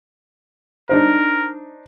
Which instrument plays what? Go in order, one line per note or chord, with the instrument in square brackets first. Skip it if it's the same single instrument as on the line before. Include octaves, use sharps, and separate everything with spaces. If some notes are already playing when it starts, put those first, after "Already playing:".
[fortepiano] D4 D#4 C5 [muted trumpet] A#4